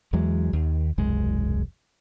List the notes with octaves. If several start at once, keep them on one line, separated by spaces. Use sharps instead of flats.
E2 E3 F#3 G#3
D#2 D#3
E1 C2 F#2 G#3